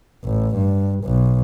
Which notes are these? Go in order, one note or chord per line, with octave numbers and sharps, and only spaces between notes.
A1
G2
B1